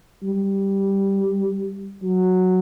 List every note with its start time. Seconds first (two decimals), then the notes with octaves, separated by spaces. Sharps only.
0.23 G3
2.03 F#3